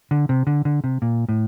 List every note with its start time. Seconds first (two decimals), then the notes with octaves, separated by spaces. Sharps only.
0.11 D3
0.29 C3
0.47 D3
0.65 D3
0.84 C3
1.02 A#2
1.29 A2